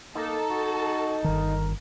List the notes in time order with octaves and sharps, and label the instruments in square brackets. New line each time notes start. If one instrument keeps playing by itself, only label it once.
[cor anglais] A#3 [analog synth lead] D#4 [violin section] A4 A5
[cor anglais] F#4
[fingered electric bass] G1 D#3 [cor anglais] A#4